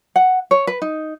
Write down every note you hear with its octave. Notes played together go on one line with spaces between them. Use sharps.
F#5
C#5
B4
D#4